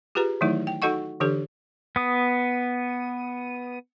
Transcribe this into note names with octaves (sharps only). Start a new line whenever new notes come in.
F4 G4 G#4 B4 A#5
D#3 E3 F#3 A3 D#4 E4
G5
D#4 F#4 A4 D#5 F#5 C#6
D3 E3 D4 G4 A4
B3 D#6